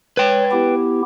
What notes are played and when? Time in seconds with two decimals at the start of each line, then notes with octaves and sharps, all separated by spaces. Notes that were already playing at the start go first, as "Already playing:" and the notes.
0.17 B4 C#5 G5
0.52 B3 E4 G4